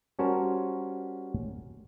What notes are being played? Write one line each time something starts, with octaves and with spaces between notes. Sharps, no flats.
G3 C#4 F#4 A#4 C5 A5